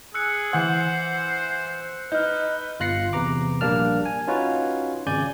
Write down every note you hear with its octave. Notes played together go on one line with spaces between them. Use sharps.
G#4 E6 F#6 C#7
E3 C5 F#5
D#4 B4 F6 G6
G1 F4 F#6 A#6 C7 C#7
E2 C3 B4 A#5 D6
A#1 G3 A#3 D4 A5 F6
G#5
C#4 D#4 F4 F#4 B4 C#5
G#1 C#3 D5 G#5 G6 G#6